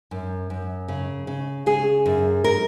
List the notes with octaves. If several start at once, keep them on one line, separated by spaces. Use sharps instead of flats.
F#2
F#2
C#3
C#3
C#3 G#4
F#2
A#4